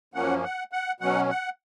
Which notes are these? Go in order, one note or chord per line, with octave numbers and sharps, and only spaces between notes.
F#2 F3 A#3 C#4 F#5
F#5
F#5
B2 F#3 C#4 F#5
F#5